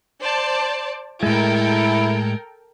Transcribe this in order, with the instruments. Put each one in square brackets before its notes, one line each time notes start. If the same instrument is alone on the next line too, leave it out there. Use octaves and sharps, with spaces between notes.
[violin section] C5 D5 A5
[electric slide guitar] A2 G#3 [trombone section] E4 [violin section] A4 A#4 G5